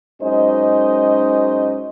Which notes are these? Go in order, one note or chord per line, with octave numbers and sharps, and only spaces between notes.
F#2 G#3 C#4 D#4 C5 D#5